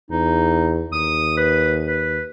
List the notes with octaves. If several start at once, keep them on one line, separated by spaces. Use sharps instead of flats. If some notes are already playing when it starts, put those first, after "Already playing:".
E2 D#4
D#2 D#6
B4
B4